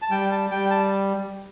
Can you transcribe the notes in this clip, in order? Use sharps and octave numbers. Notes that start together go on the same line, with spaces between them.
A5
G3 G5
A5
G3 G5
A5